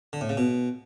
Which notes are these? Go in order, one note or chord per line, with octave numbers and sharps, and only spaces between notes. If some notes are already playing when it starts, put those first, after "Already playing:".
D3
A2
C#3
B2